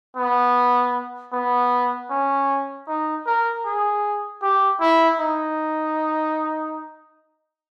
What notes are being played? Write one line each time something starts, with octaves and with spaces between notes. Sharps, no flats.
B3
B3
C#4
D#4
A#4
G#4
G4
E4
D#4